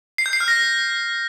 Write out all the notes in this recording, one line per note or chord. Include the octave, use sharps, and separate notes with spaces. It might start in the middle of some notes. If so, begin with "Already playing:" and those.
C7
G6
C7
F6
A#6